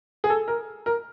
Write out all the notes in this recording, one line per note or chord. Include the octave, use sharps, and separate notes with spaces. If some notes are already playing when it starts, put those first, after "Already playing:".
G#4
A4
A#4
A#4